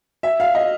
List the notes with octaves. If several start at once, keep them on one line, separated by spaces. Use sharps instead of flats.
E5
F5
D#5